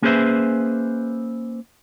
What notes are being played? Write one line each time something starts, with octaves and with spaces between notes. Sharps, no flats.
A#3 C#4 G#4 B4 C5 E5